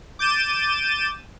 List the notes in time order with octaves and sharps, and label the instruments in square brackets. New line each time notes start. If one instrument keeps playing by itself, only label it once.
[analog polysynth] D6 G6 A6 D#7 E7